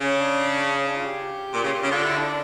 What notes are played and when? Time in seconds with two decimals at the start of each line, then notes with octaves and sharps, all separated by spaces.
0.01 C#3 C#4
0.20 D4
0.77 C#4
0.87 D4
0.96 F4
1.06 G4
1.54 A#2
1.64 C#3
1.83 C#3
1.92 D3 F4
2.05 E4
2.18 D4